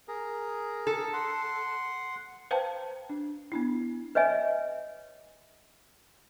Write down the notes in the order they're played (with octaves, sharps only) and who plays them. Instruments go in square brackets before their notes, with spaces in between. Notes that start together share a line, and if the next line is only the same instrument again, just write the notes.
[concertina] G#4 A#4
[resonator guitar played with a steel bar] A4
[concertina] F#5 C6
[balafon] B4 C5 F5 G5 A5 A#5
D4
B3 D4 E4
[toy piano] B4 C#5 D#5 E5 G#5